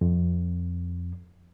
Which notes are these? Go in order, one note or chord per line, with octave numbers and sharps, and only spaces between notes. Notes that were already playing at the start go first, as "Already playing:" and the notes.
F2